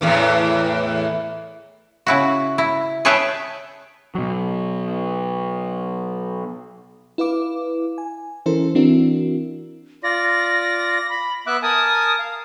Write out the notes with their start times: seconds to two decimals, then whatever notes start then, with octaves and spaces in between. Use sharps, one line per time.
0.01 E2 A2 E3
2.06 C#3 E4 F#4
2.58 E4
3.05 G#4 B4 C#5 E5 G5 A5
4.15 B2 F#3
7.18 E4 B4 F5 D6
7.98 G#5
8.46 E3 C#4 E4 A4 A#4 C5
8.75 E3 C4 D4 E4 F#4 A#4
10.03 F4 D5 A#6
11.09 B5
11.47 B3 E5 D6 F#6
11.63 A#4 G#5 A5 D#6
12.19 F5